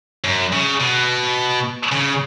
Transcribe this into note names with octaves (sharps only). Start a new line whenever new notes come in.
F#2
C#3
B2
C#3